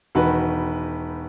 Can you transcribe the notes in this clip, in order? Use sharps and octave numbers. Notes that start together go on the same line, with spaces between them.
E1 D#3 F#4 B4 B5